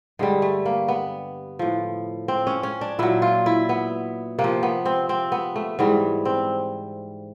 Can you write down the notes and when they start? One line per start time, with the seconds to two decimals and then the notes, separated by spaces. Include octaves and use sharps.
0.19 G2 D3 G3 G#3
0.42 A3
0.66 A#3
0.88 B3
1.59 A2 F3
2.28 C4
2.47 C#4
2.63 C#4
2.81 D4
2.99 A#2 F#3 E4
3.22 F4
3.46 E4
3.69 B3
4.38 C3 A#3
4.44 F3
4.63 B3
4.86 C4
5.09 C4
5.32 B3
5.56 A3
5.79 G#2 E3 G3 B3
6.25 C4